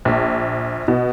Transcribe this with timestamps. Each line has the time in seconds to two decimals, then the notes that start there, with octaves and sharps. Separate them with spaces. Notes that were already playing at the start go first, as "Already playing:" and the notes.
0.05 A#1
0.88 B2